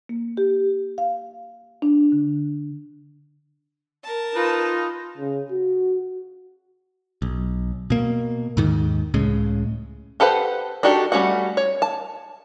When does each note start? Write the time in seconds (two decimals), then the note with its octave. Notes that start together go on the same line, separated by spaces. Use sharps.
0.09 A#3
0.37 G4
0.98 F5
1.82 D4
2.12 D3
4.03 A#4 A5
4.35 D#4 F4 B4
5.17 C#3
5.51 F#4
7.22 B1
7.90 B2 A#3
8.57 D#2 G#2 D#3
9.14 C#2 A2 C#3 G#3
10.20 G4 A4 B4 C5 F#5
10.83 D4 D#4 F#4 G4 A4
11.12 G3 A3 C#4 F#4 F#5
11.57 C#5
11.82 A5